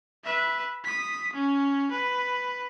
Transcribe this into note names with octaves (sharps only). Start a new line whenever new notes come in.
B4 E5
D#6 B6
C#4
B4